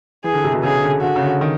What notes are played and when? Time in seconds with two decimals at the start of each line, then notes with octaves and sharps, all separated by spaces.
0.24 E3 G#4
0.33 D3
0.44 C3
0.53 B2
0.63 C#3 G#4
0.82 D3
1.02 D3 F#4
1.16 C#3
1.22 D3
1.41 D#3